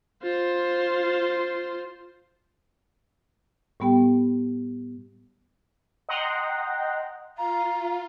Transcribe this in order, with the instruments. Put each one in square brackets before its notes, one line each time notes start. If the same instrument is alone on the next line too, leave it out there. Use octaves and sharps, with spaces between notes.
[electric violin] F4 C5
[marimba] A2 G3 B3 G4 G5
[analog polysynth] D#5 F#5 G5 A#5 C6
[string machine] F4 [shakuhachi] F5 [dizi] A#5